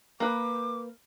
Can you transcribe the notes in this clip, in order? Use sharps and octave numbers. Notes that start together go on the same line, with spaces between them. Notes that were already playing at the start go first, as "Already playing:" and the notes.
A#3 B4 D6